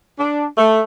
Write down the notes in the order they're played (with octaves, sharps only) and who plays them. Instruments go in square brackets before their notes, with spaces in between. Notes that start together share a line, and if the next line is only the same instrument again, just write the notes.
[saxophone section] D4
A3